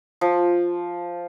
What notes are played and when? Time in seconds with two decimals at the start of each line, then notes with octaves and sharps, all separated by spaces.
0.21 F3